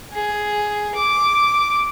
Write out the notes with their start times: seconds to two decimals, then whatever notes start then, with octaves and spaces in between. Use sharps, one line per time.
0.13 G#4
0.95 D6